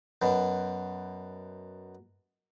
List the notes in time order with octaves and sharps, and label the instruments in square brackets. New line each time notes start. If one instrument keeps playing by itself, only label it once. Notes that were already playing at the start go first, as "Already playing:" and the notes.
[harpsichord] F#2 B2